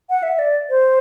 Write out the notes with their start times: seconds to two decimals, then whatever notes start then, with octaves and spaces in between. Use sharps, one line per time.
0.10 F#5
0.23 E5
0.39 D5
0.70 C5